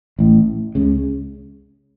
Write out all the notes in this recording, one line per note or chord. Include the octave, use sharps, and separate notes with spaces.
A1 A2
C#2 C#3